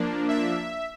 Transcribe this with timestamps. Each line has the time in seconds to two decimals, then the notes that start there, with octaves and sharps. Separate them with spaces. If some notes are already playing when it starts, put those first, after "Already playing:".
Already playing: F3 A#3 D4
0.28 E5